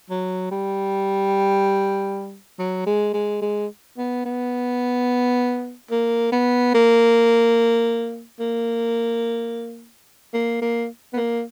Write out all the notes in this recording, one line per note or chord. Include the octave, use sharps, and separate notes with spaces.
F#3
G3
F#3
G#3
G#3
G#3
B3
B3
A#3
B3
A#3
A#3
A#3
A#3
B3
A#3